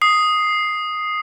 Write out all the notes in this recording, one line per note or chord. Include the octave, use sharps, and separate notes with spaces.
D#6 C7